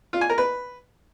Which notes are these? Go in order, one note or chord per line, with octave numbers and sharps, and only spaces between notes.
F4
G#5
A#4
B4